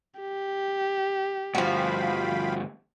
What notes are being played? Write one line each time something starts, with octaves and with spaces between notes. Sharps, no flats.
G4
D2 G2 F3 F#4 F5 G5 B5